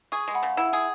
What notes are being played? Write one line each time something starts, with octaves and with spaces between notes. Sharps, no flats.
G#4 G#5 C#6
G#3
F#5 B5
C#3
E4 F#5 B5
G#4